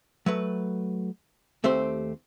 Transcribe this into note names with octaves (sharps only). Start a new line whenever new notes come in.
F#3 A3 B4
D#2 A3 C4 G4 C5